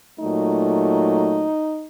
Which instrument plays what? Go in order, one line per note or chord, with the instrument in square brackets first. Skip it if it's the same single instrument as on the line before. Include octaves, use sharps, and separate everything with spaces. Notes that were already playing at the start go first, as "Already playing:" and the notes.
[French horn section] A#2 F#3 A3 D#4